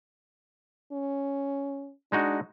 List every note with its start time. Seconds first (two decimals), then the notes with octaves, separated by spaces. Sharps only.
0.92 C#4
2.12 G#3 D4 D#4 F#4